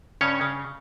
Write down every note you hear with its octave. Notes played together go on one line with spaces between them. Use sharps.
G2 C#3 C#4 C#5
C#3